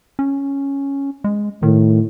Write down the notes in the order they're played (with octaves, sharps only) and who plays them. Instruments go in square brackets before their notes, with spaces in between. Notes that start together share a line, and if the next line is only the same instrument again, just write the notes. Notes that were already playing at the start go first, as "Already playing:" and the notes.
[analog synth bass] C#4
G#3
[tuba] A2 [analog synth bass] D#3